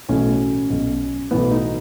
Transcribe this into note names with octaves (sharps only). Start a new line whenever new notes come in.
B1 A2 E3 C#4
B1 B2
B1 A2 E3 B3
D#4